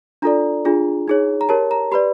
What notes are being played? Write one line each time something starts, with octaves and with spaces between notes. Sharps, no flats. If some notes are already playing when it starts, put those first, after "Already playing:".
D4 F4 A4 D5 A#5
D4 F4 G#4
D#4 G#4 C#5
A#5
G4 A#4 C#5 A5
A#5
G4 B4 D5 B5